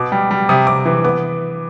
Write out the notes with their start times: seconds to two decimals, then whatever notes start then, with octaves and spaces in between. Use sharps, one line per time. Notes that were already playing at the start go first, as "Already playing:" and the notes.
Already playing: B2 D6
0.12 G3
0.31 G3
0.49 C3 D#6
0.67 C3 D6
0.86 E3
1.04 B3 D6